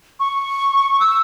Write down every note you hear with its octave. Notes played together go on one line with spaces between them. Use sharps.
C#6
E6